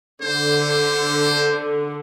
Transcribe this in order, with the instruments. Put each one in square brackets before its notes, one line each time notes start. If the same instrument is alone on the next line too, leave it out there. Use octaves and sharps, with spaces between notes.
[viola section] D3 [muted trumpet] C5